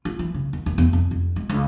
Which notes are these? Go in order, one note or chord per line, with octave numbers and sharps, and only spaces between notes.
F4
E3
C#3
D#2
D#2
E2
F2
F2
G#3
C#2